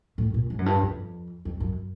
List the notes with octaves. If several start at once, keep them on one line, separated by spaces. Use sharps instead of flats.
A2
A#2
G#2
F#2
G2
F2
F2
F#2